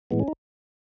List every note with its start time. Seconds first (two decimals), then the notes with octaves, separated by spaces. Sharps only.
0.11 A2 E3 G#3 B3
0.20 C#4
0.28 D#4